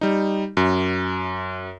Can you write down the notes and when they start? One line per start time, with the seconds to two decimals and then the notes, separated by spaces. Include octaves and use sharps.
0.01 G3 D#4
0.57 F#2